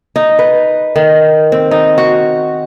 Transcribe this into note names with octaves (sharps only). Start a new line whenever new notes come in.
D#4
B4
D#3
C4
D#4
F#4